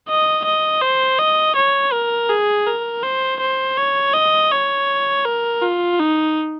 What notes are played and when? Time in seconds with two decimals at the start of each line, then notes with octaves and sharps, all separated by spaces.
0.09 D#5
0.45 D#5
0.82 C5
1.19 D#5
1.56 C#5
1.93 A#4
2.30 G#4
2.67 A#4
3.03 C5
3.40 C5
3.77 C#5
4.14 D#5
4.51 C#5
5.25 A#4
5.62 F4
6.00 D#4